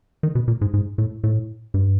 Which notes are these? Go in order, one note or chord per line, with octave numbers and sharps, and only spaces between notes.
D#3
B2
A#2
G#2
G#2
A2
A2
G2